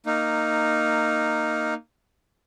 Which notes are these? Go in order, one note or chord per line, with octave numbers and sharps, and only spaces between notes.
A#3 D#4